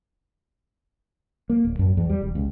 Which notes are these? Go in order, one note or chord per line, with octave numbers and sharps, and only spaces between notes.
A#3
D1
F#2
E2
G3
E1
C#2